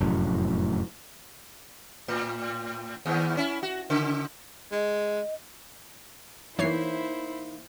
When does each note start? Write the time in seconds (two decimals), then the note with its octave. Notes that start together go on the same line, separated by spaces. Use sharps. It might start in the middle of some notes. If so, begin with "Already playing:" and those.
0.01 F1 F#2 A2
2.08 A2
3.06 D#2 E3
3.37 C#4 E4
3.63 F#4
3.90 C#3
4.72 G#3 D#5
6.59 E3 A#3 D#4 E4 C5 C#5 C7